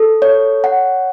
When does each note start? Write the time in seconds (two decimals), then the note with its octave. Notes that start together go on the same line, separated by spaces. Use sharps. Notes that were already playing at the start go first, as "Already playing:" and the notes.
Already playing: A4
0.22 C#5
0.64 F#5